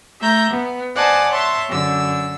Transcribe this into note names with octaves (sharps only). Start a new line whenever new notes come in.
A3 E5 A#5 G6
B3
C5 D5 D#5 F#5 G#5 A5
C#5 E5 A5 C6
F#2 D3 E6